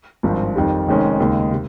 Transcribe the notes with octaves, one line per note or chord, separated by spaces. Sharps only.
G#1 G2 F3
F2 D#3 G3
F1 F2 D#3 G#3 C#4
D#2 C#3 G#3 D#4
C3